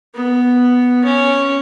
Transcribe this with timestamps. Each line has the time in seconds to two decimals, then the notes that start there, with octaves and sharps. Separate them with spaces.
0.15 B3
1.04 C#4